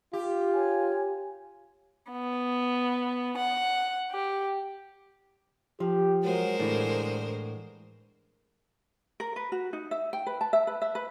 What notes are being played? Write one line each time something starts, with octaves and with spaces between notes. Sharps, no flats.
F4 G4
C#5 G#5
B3
F#5
G4
F3 G4
F#3 G#3 A#4 C5
A2 D3 E3
A#4
B4
F#4
D#4
E5
G5
B4
A5
E5
B4
E5
B4